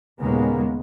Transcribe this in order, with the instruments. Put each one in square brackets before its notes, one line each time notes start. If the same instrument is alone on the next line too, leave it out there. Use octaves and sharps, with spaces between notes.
[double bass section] D#2 A#2 C#3 G#3 A#3 B3